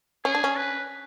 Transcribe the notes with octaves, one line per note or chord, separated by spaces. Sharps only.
C#4 G#4
D4
C#4
B4